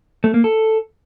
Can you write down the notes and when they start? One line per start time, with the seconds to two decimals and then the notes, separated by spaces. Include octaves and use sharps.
0.24 A3
0.34 A#3
0.44 A4